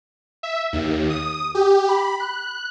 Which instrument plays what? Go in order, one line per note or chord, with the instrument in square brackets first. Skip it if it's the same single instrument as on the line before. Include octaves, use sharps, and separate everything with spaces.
[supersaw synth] E5
D#2
D#6
G4
B5
F#6